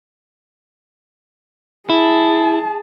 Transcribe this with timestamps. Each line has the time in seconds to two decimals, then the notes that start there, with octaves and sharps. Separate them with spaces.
1.90 E4 G#4 A5